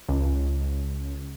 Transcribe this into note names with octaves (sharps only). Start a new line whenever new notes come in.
C#2